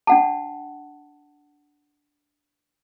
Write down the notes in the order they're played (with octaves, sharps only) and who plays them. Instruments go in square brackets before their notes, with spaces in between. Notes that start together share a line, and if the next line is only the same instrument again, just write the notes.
[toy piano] D4 F#5 A5